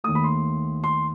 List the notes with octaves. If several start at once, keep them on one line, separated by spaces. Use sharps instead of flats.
D#2 D#3 A3 D#6
B5
C6
C6